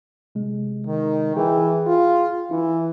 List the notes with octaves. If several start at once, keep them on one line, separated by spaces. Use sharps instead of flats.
C3 G#3
D#3
E3 G#4 G5
F4
E3 E4